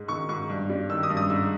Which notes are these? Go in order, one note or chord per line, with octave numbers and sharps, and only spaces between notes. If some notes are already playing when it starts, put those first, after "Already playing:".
Already playing: G#2 G#3
D#3 C#6
G#2 C#6
G2
G3
D#3 E6
D#6
G2
D#6
G#2 E6